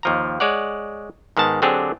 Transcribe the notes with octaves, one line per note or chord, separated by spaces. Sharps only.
D#2 F3 A#5
G#3 C#5 D5 F#5
G#2 D#3 B3 A5
D3 F#3 C4 D4 G4 G#4